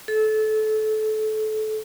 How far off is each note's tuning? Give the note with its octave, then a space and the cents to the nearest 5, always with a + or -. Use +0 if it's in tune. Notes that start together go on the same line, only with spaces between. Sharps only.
A4 -25